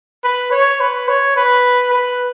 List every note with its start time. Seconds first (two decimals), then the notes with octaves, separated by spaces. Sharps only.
0.24 B4
0.52 C#5
0.80 B4
1.08 C#5
1.36 B4
1.93 B4